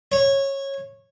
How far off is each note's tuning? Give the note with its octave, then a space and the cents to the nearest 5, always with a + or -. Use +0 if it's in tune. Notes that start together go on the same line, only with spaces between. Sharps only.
C#5 -15